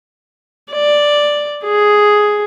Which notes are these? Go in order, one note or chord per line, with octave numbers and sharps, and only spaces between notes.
D5
G#4